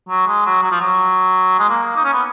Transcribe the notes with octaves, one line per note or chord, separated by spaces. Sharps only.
F#3
G#3
F#3
F#3
F3
F#3
G#3
A#3
D#4
C#4
B3